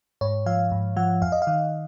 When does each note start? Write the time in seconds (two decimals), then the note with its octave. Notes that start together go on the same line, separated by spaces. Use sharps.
0.21 G#2 C#5
0.46 F3 F5
0.72 G#2
0.96 F3 F#5
1.22 F2 F5
1.32 D#5
1.42 F5
1.47 D#3